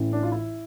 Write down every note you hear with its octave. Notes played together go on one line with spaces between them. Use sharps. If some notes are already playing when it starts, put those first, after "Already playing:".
Already playing: A1 A2 E3
D4
F4
E4